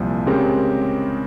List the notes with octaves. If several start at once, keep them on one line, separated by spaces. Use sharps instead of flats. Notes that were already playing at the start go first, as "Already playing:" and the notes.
Already playing: C2 A#2 F3
C#3 G#3 C4 G4 A#4